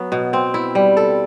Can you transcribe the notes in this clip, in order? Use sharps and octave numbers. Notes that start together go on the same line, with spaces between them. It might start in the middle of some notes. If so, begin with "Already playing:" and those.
Already playing: F#3 B3
B2
C4
E4
G3
A4